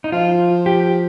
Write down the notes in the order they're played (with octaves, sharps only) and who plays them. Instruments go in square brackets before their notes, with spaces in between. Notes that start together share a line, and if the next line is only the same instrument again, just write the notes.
[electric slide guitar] D#4
[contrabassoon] F3 [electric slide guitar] F4
[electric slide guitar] G4